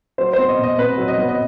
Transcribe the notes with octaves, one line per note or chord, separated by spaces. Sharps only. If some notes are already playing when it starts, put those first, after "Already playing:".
F#3 C5
C5
B3
D#5
B2
D#5
B2 B4
F#3
D#5
B3
D#5